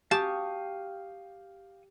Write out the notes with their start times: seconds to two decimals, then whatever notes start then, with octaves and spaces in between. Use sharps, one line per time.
0.11 G4 F5 A5 C#6 D#6